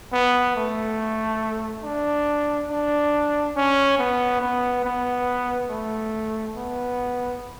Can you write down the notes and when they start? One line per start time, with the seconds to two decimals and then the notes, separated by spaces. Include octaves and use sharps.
0.13 B3
0.56 A3
1.84 D4
2.70 D4
3.56 C#4
3.98 B3
4.41 B3
4.84 B3
5.69 A3
6.56 B3